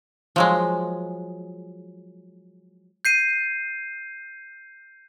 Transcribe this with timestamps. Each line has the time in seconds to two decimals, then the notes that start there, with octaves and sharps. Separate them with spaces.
0.36 F3 F#3 G#3
3.05 G6 C7 D#7